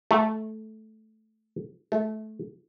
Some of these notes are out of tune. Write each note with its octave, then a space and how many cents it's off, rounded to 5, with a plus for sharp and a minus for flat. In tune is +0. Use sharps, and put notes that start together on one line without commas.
A3 -10
A3 -20